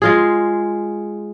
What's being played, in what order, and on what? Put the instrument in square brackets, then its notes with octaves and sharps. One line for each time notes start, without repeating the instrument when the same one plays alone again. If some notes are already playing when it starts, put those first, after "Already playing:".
[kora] G#3 F4 G#4